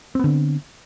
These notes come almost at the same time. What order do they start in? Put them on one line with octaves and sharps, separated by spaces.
C4 B3 D3